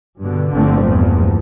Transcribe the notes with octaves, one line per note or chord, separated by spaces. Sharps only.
G2 B2 D3
G1 G2 D3 F3 A3 C4
E2 G2 A#2 F3